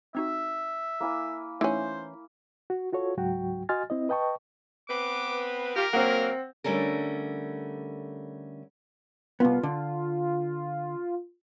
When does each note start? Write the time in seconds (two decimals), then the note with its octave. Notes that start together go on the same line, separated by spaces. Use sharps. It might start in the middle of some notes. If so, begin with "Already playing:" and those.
0.15 C4 D#4 F#4 E5
1.00 A#3 E4 G#5
1.61 E3 A3 C#4 D#4 C5 E6
2.70 F#4
2.93 F4 F#4 A4 C#5
3.17 C#2 G#2 F#3 F#4 G5
3.69 F#4 D#5 G#5 C6 F6 A6
3.90 C4 E4 D#5
4.09 B4 D#5 G5 A5 C#6
4.89 B3 C4 B4 D6
5.76 F4 G4 A#4
5.93 F#3 A#3 C4 F#5
6.64 D3 G3 A3 C#4 A#4
9.40 C2 B3 F4
9.63 D3